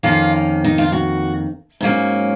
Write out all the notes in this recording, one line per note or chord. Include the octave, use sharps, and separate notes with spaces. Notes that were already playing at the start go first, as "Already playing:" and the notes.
F2 D#3 A#3 C#4 F4
D#4
F4
F#4
G#2 F#3 A#3 C#4